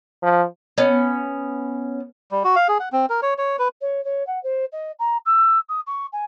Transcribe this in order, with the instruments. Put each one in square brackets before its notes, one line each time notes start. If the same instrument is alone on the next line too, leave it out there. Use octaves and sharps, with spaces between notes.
[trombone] F3
[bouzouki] B3 C#4
[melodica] G3
F#4
F5
G#4
F#5
C4
A#4
C#5
C#5
B4
[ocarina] C#5
C#5
F#5
C5
D#5
A#5
E6
D#6
C#6
G#5